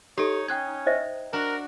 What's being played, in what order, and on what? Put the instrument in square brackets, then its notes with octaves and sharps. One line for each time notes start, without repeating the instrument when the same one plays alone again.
[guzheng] D#4 [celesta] G4 A4 [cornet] C#5
[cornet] C#4 [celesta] G5 F#6 G#6
[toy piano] C5 D#5 E5
[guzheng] D4 F#4 [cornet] A#4